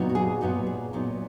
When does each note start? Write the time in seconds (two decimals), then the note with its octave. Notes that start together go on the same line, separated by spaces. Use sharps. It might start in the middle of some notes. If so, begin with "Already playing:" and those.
Already playing: A#2 F#3 B3 D#4
0.09 F#4
0.15 G#4
0.41 A#2 F#3 B3 D#4 F#4
0.67 G#4
0.93 A#2 F#3 B3 D#4